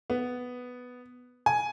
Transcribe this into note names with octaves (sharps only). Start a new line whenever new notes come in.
B3
G#5